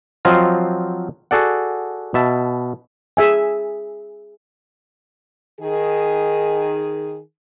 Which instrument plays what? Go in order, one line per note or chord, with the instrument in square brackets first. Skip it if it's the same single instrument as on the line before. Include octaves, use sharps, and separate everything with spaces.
[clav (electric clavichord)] F3 F#3 C4 F4 D#5 F5
F#4 G#4 A4 D5 F#5
B2 E5 A5
[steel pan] G#4 E5 G#5
[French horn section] D#3 G#4